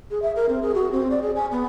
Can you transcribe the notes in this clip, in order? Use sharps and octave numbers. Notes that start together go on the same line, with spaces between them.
G#4
E5
A#4
C4
G#4
F#4
C4
D5
G#4
G#5
B3